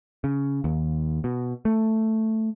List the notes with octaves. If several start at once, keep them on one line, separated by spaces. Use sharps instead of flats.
C#3
D#2
B2
A3